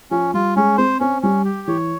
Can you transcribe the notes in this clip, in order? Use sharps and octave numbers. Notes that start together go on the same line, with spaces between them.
F3 C#4
G3 F4
G#3 C#4
C4 C5
C4 C#4
G3 C#4
G4
E3 C#5